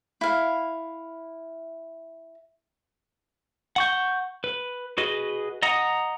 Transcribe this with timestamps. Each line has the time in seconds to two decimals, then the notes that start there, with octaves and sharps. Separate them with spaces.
0.21 E4 F5
3.76 F#5 C#6 G6
4.44 B4
4.98 F#4 G#4 B4 D#5
5.62 D#5 F#5 A#5 D#6